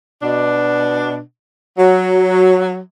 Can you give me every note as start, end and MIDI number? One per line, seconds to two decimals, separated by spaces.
0.22 1.19 47
0.22 1.19 62
1.78 2.77 54